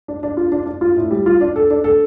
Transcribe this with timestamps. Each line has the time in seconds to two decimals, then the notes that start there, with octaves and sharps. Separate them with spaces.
0.08 D4
0.23 D4
0.37 F4
0.52 D4
0.66 D4
0.81 F4
0.97 A2
1.11 G3
1.26 F4
1.41 D4
1.56 A4
1.71 D4
1.84 A4